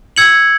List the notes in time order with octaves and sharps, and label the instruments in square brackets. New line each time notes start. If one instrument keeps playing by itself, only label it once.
[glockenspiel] E6 G#6 C#7 F#7